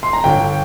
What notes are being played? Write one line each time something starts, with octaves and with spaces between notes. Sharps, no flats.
C6
A#5
G1 G5